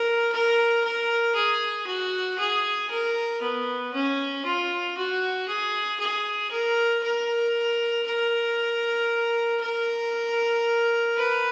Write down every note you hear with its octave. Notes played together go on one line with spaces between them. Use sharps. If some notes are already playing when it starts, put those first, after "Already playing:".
Already playing: A#4
A#4
A#4
G#4
F#4
G#4
A#4
B3
C#4
F4
F#4
G#4
G#4
A#4
A#4
A#4
A#4
B4